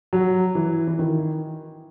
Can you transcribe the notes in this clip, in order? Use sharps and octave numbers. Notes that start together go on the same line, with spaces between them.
F#3
E3
E3
D#3